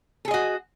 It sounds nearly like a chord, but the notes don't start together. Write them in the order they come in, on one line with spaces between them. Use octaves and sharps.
A4 G#4 D#5 F#4